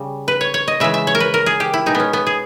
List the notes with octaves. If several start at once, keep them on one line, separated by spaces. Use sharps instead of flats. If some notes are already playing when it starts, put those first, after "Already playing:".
Already playing: C#3 G3
B4
C#5
C#5
D#5
C#3 E3 G#3 E5
E5
C#5
A#4
B4
A#4
G#4
G4
E4
B2 G#3 D#4
B3
C#4
B3
G#4